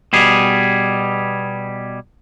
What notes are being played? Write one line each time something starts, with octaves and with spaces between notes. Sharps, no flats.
B2 G3 G#4